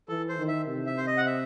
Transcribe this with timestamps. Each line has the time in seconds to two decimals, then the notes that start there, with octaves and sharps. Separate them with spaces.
0.08 E3 A4
0.29 C5
0.38 D#3
0.48 E5
0.67 C3
0.87 E5
0.97 C5
1.07 D#5
1.17 F#5
1.26 E5